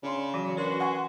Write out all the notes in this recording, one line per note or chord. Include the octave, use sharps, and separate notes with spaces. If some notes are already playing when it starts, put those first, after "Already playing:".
C#3 D4 C6
E3 F#3 F#4
C#4 D4 F#4 A#4 B4 C6
F#5 G#5 C#6